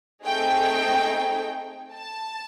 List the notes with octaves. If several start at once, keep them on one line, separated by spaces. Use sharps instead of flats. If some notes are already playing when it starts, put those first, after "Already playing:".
A3 C4 D#4 G#4 G5
A5